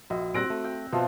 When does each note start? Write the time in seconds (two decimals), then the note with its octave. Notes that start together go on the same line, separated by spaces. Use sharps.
0.10 A#1 F4 F#4 D#5 E5
0.34 A#2 G3 C4 F#6 A#6 D7
0.50 A3
0.65 G5
0.93 B2 F3 C5 E5